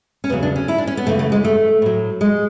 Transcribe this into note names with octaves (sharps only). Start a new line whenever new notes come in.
C#4
E2 C#3 F#3 B3
D4
C#4
E4
D4
C#4
B3
F#2 C#3 E3 A3
A3
G#3
A3
A2 F#3
G#3